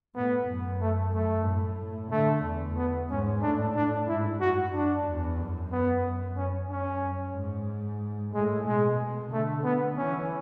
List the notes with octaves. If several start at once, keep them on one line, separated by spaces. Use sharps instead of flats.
A2 B3
F#2
A3
F#2 A3
A2
D3 A3
E2
B3
G#2 C#4
A2 D4
A2 D4
G#2 E4
F#2 F#4
D4
E2
F#2
B3
F#2 C#4
C#4
F#2
G#2
A2 G#3
B2 G#3
D3 A3
B3
E3 C#4